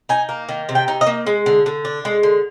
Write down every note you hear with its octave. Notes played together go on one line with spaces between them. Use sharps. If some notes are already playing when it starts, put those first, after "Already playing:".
D#4 G#5
A#3
D#3
C3
G5
D#4
D#5
A#3
G#3
D3
D3
D4
G#3
D3